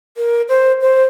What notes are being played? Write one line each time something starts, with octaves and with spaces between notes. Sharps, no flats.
A#4
C5
C5